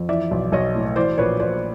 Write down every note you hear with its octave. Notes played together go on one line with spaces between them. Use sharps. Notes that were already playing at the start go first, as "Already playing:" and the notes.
Already playing: F2
E3 D5 E5
B1
B1 C#5 D#5
A2
E3 C5 D5
A#1 B4 C#5
A#1 C5 D5